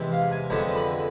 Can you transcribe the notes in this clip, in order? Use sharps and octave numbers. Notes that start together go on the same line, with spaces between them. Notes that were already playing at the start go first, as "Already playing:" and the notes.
Already playing: E2 C3 E3 G#3
F5
G#5
F2 D3 G#3 B3 D4 A5
B5